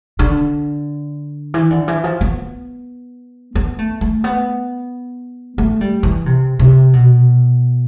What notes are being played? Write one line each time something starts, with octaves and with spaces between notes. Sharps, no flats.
D3
E3
D3
E3
F3
B3
B3
A3
A3
B3
A3
G3
E3
C3
C3
B2